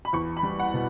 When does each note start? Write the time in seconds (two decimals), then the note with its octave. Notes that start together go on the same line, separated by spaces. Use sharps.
0.05 B5
0.13 E2 C#6
0.37 B5
0.43 G3
0.60 F#5
0.74 B2